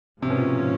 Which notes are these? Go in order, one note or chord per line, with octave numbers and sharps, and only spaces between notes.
G#2 C3 F3 A#3 C#4
B2
A#2